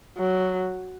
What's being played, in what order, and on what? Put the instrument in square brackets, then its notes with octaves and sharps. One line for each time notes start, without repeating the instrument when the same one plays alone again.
[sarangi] F#3